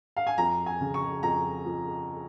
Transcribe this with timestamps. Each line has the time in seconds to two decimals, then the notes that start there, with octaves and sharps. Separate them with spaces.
0.17 F5
0.27 G#5
0.38 F2 A#5
0.66 G#5
0.81 C#3
0.94 C#6
1.23 F2 A#5
1.65 F3